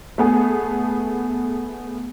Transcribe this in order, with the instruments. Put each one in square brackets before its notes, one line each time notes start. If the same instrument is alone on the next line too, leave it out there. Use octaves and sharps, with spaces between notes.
[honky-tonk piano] A3 B3 G#4